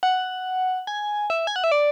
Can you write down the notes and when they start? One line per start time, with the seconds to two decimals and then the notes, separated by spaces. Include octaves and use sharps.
0.03 F#5
0.87 G#5
1.30 E5
1.47 G#5
1.56 F#5
1.64 E5
1.72 D5